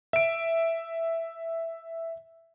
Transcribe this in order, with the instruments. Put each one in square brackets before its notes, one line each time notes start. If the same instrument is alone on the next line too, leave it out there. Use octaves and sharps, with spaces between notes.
[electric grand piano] E5 D7